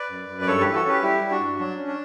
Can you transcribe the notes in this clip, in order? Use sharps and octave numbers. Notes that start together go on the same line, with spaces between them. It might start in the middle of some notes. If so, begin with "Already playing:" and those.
Already playing: B4 D5
F#2
F#2
D5
G2 A4 C#5
G4 B4
E3
F#4 A4
C#4 G4 B4
G3 E4 G4
G3
D4 F#4
G2
F#3 D4
C#4
D4